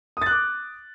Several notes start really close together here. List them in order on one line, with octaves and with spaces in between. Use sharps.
D#6 A6 F#6 D6